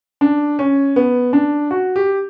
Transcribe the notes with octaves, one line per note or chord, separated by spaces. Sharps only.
D4
C#4
B3
D4
F#4
G4